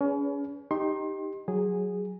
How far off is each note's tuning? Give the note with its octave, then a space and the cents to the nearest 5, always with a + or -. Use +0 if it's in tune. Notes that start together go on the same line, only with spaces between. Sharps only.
C#4 +35 G#4 +5 B4 +0
D#4 +0 G4 +0 C6 +30
F#3 +0 G#4 -10